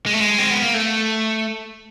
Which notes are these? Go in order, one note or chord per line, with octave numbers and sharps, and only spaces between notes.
G#3
A3
G#3
C4
B3
A#3
A3